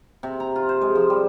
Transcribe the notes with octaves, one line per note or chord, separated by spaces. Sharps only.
C3
A#5
F4
C5
G#3
F3
G3